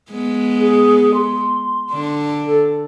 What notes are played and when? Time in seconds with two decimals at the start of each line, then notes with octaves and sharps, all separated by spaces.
0.11 G#3 B3
0.59 G#4
1.14 C6
1.91 D3 D4
2.46 A4